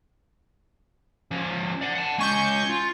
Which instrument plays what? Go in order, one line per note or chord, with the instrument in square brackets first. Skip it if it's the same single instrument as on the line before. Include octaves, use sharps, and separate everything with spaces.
[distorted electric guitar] F3 C#4
D5 F#5
F#5 A5
[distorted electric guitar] G#3 C#4 [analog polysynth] G#5 C#6 G6
[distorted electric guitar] F4